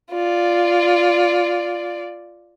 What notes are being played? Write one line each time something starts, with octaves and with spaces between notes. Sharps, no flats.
F4 D5